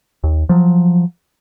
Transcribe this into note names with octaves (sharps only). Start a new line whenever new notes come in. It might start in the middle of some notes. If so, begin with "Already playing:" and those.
D#2
F3 F#3